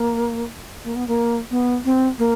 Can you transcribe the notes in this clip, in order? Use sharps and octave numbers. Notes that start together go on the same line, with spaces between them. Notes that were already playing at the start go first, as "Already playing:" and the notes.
Already playing: A#3
A#3
B3
A#3
B3
C4
A#3